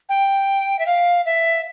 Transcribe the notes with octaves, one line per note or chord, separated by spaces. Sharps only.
G5
E5
F5
E5